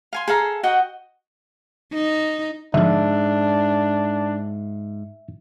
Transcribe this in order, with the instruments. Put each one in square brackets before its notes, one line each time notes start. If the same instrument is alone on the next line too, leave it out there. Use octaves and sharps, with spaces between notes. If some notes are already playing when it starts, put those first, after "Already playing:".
[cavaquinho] F5 G#5 C6
G#4 A4 F5 A#5
F#4 D#5 F#5 G5
[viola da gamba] D#4
[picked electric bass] G#2 [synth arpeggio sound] D3 F3 [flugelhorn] D4 [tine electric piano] E5